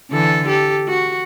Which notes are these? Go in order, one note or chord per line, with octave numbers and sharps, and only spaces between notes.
D3 E3 A4
G4 A4
F#4